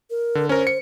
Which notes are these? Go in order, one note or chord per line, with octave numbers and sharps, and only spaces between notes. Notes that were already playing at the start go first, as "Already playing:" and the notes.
A#4
D3
C#4 A#4 C5
C#7